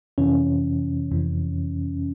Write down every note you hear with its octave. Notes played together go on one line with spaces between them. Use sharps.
F2 C3 E3 C#4
F2 C3 E3